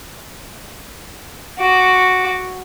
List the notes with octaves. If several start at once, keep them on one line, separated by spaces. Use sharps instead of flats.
F#4 D6